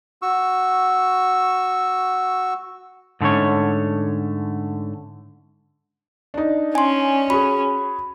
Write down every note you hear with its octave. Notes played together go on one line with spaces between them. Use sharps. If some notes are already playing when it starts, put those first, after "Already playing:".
F#4 C#6 E6
G#2 D3 A3 C#4 C#5
D4 D#4
C#4 G#5 C6
F#4 G#4 B5